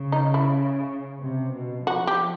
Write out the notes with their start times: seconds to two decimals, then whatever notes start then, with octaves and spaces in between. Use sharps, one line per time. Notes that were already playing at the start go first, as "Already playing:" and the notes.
Already playing: C#3
0.12 D#4
0.34 E4
1.21 C3
1.54 B2
1.86 F3 F#4
2.07 G4